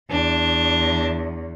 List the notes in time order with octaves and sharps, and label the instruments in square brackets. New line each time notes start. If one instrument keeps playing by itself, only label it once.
[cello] E2 [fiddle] D4